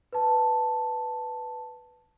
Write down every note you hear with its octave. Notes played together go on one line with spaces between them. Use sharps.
B4 A5